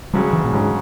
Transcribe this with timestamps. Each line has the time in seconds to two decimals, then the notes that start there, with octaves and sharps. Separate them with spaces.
0.14 D2 C#3 F#3 G3
0.33 E3
0.44 A#2
0.53 G#2 C#3 F#3